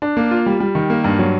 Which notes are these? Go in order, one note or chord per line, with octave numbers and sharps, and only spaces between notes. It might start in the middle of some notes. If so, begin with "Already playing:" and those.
D4
A#3
F4
G3
G3
D#3
A#3
G2
F#3